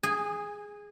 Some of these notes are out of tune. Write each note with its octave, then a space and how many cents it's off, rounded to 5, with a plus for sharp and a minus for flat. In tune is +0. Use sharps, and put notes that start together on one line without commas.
G#4 +0 G#5 -20